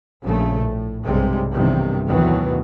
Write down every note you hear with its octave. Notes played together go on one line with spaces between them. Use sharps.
A#1 C#3 A3
A2
B1 G2 C3 G3 G#3
B1 E2 G2 C3 D#3
D2 B2 D#3 E3 F#3